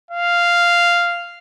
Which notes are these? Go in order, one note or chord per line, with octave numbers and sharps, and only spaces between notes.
F5